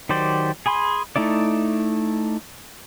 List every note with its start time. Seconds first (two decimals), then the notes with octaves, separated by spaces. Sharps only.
0.09 D#3 F#3 G4 C5 D5
0.66 G#4 G#5 B5 C6
1.16 A3 D#4 E4 D5